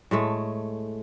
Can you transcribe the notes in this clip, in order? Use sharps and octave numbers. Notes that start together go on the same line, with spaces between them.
A2 G#3 A3